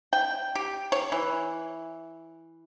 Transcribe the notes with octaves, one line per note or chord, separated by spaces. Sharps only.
G5
G4
C#5
E3